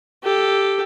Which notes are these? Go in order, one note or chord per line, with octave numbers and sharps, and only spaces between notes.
G4 A4